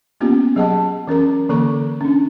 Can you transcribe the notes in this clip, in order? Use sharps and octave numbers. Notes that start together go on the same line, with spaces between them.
A#3 B3 C#4 F4 G4
F#3 G#4 D#5 F#5 A5
E3 C#4 A#4 A#5
D3 E3 A#3 A4 A#5 C#6
C#4 D4